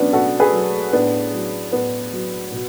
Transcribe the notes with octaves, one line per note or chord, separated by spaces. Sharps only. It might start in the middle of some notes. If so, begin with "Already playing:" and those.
Already playing: B2 F#3 B3 C#4 D4
B2 F#4 A4
G#4 B4
F#3
A2 B3 D4
F#3
A2 B3
F#3
B2